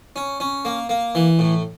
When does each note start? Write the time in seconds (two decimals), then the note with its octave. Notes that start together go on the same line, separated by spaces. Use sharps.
0.16 C#4
0.40 C#4
0.65 A#3
0.89 A#3
1.15 E3
1.39 A2